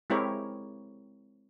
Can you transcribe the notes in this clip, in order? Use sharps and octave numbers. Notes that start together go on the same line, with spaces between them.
G#3 C4 E4 G4 A#4 C#5